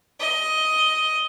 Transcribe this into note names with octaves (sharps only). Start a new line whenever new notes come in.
D#5